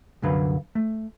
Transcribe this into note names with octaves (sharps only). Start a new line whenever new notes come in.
C2 F#2 D3 F#3 B4 F5
A3